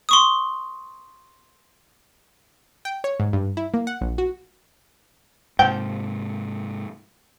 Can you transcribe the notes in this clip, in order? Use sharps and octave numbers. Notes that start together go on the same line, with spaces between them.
C6 C#6 D#6
G5
C#5
G#2
G2
E4
A#3
F#5
A#1
F#4
G#2 C3 F3 G5